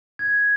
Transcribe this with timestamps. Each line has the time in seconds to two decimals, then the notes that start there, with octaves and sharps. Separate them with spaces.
0.19 G#6